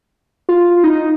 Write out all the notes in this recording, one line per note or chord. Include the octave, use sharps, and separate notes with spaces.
F4
D#4